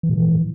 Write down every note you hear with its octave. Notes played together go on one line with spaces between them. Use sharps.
E3
A#2
E3